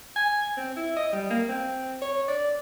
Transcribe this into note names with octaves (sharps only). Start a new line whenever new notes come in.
G#5
C4
E4
D#5
G3
A#3
C4
C#5
D5